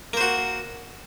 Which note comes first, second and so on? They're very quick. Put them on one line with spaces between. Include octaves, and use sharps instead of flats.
A#3 C5 F#4